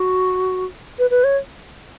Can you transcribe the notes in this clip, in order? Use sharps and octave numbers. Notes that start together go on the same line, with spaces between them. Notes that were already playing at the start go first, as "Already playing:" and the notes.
Already playing: F#4
B4
B4
C#5